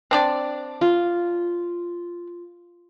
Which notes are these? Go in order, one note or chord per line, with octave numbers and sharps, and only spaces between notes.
C4 D4 D5
F4